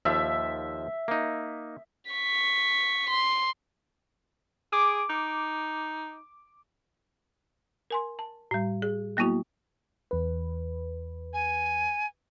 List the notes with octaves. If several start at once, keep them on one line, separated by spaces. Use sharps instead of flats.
D#2 F3 E5
A#3 D#4
C#6 B6
C6
G#4 D6
D#4
A#4 G#5 C6
A5
A2 G3
G#4
F#3 A#3 B3 E4 F#4
E2 B4
G#5